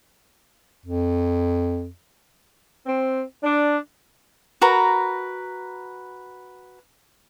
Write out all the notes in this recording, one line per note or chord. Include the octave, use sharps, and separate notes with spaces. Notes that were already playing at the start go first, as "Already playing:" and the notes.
F2
C4
D4
F#4 A#4 B4 A#5